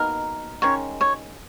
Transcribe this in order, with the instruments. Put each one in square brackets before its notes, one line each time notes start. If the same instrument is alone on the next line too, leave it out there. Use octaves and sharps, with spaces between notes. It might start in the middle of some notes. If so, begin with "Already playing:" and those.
Already playing: [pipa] B2 A#3 D#4 A#4
[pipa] D#3 G#3 C#4 [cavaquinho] C#5
[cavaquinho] C#5